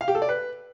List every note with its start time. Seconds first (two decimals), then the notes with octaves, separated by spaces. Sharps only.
0.01 F5
0.08 G4
0.15 A4
0.22 D5
0.29 B4